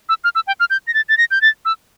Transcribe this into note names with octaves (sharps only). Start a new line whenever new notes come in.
E6
F6
E6
G5
F6
G6
A#6
A6
A6
A#6
G6
A6
E6